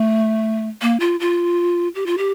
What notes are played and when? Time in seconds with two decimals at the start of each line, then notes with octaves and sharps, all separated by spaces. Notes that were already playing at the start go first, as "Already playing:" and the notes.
Already playing: A3
0.82 A#3
1.00 F4
1.20 F4
1.95 G4
2.06 F4
2.18 G4